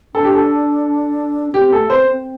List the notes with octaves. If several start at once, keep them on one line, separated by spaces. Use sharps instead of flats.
D4 A4
G4
A4
D4
C4 G4
A3 A4
C4 C5
C4